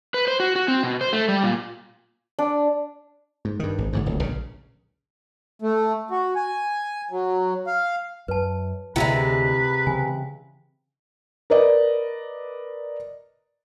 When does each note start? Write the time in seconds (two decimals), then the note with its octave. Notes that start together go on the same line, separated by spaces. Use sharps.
0.14 B4
0.28 C5
0.40 F#4
0.56 F#4
0.68 C4
0.83 B2
1.01 C5
1.13 A3
1.28 G3
1.43 A#2
2.39 D4
3.45 G#2
3.60 G2 D#3
3.78 G#1
3.93 G#1 D2 G#2
4.06 D1 C#2
4.21 A#1 C#3
5.62 A3
6.11 F#4
6.36 G#5
7.11 F#3
7.67 F5
8.28 F#2 B4 A5
8.96 D2 C3 F3 G#3 E4 B4 E5
9.87 C#3 E3 C4 G#5
11.50 A#4 B4 D5 D#5